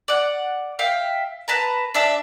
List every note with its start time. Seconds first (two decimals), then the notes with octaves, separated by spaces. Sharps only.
0.08 D5 F#5
0.79 E5 F5 G5
1.48 B4 A5 A#5
1.94 D4 E5 A5